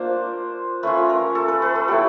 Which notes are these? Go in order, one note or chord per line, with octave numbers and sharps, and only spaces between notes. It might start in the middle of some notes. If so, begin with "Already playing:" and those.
Already playing: A#3 D4 F4 C5
A3 C#4 F4 B4
A#4
A4
B4
B4
A4
F#3 B3 E4 G4